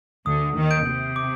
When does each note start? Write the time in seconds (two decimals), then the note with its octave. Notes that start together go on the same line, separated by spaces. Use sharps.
0.26 D2 D3 D#6
0.55 D#2 D#3
0.71 G6 D7
0.86 C3
1.16 D6